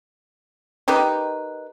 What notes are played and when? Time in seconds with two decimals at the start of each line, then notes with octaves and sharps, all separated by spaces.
0.88 D#3 D#4 G4 B4